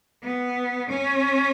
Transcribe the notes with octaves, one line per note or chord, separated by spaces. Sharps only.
B3
C#4